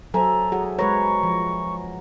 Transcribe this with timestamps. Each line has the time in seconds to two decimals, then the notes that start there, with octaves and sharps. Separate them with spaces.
0.14 F#3 A4 C5 E5 G#5 A#5
0.52 F#3 G#4
0.79 G#3 B4 C#5 A#5 C#6
1.23 F3